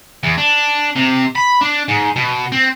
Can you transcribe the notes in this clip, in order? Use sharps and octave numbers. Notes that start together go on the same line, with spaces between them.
E2
D4
C3
B5
D4
G#2
B2
C4